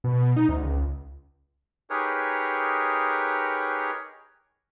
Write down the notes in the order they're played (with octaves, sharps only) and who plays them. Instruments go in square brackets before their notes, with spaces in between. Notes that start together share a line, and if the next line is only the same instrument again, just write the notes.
[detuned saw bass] B2
D#4
D2
C#2
[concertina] D#4 G4 G#4 A#4 B4 C#5